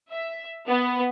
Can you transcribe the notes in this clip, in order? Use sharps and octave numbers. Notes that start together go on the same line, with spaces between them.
E5
B3